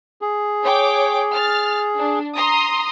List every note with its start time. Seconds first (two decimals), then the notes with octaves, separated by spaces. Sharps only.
0.22 G#4
0.63 C#5 G5 D6
1.33 F6 A6
1.97 D4
2.36 A#5 C6 D#6